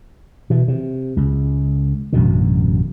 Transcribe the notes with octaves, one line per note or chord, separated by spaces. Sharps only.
B2 E3
C3
C#2
A1 F#2 B2 D3